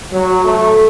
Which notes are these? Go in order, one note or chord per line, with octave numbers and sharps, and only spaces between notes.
F#3
A3